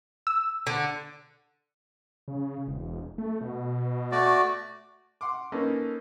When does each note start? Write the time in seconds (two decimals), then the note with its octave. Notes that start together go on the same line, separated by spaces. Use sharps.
0.27 E6
0.67 D3
2.28 C#3
2.68 E1
3.18 A3
3.41 B2
4.12 A3 F#4 D5
5.21 F#5 C6 D6
5.52 A#3 C#4 D#4 A4 B4